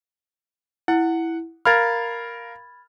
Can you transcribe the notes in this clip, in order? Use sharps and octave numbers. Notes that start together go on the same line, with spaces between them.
E4 F#5
A#4 F5 B5 F6 G#6 A6